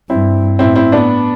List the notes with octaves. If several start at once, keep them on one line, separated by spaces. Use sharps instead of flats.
G2 C4 E4
A2 C4 E4
C4 E4
B3 D4